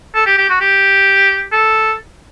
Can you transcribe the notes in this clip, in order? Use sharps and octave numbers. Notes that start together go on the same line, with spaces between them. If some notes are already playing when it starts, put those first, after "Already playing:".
A4
G4
G4
F#4
G4
A4